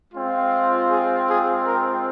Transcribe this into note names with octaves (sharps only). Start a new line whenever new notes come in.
G#3 C4 F4
G#4
G#4
A#4